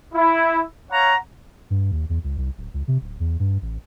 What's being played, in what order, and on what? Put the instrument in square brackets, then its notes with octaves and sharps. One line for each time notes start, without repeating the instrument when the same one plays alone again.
[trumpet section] E4
C#5 F5 F#5 A#5
[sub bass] G2
D#2
E2
C#2
C2
D1
C#2
C3
D1
E2
G2
A1